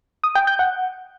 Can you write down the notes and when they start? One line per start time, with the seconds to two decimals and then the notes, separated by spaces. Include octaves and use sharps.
0.24 D#6
0.35 G5
0.47 G6
0.59 F#5